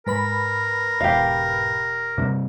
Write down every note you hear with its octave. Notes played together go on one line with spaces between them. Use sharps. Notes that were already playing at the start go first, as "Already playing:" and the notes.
G#2 A#4 B4 B5
E1 G4 F5
G2 C3